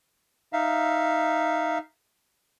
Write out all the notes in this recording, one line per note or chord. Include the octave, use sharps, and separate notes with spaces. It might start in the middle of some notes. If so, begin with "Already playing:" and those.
D#4 E5 F5